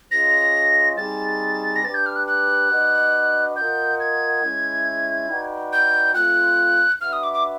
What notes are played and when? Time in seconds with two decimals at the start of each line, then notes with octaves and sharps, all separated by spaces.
0.11 C#4 F4 G#4 C5 D#5 A#6
0.97 G3 C4 D#4 G#4 A6
1.76 A#6
1.84 D4 G4 B4 A6
1.94 G6
2.06 F6
2.16 F#6
2.27 F#6
2.70 D4 F#4 B4 D#5
3.56 F4 A#4 D#5 F#5 G6
4.00 G#6
4.43 G#3 C#4 E4
5.28 D#4 F#4 B4 D5 G5
5.73 G6
6.15 A3 C4 F4 F#6
7.01 D4 F#4 B4 E5 F6
7.13 D#6
7.23 D6
7.34 D6